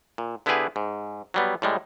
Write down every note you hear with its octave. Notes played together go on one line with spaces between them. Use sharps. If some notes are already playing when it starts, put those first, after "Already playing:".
A#2
D3 B3 E4 G4 G#4 B4
G#2
F#3 G3 B3
A2 G3 G#3